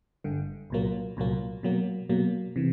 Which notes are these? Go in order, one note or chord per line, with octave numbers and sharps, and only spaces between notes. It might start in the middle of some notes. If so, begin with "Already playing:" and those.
G1 G2 D3
C2 A#2 F#3 A#3
C2 A#2 F#3 A#3
B2 F#3 A#3
B2 F#3 A#3
C3 E3